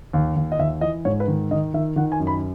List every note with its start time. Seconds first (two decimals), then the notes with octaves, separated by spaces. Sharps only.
0.13 D#2
0.36 D#2
0.52 D#5
0.59 D#2 E5
0.81 E3 D#5
1.05 G#2 C#5
1.20 B4
1.28 D#3
1.51 D#3 D#5
1.74 D#3 E5
1.96 D#3 F#5
2.12 G#5
2.20 F#2
2.27 B5